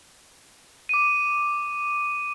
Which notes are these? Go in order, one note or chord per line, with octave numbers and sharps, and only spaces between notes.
D6 D#7